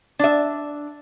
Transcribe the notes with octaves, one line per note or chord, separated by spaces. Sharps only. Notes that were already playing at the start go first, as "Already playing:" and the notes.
D4 E5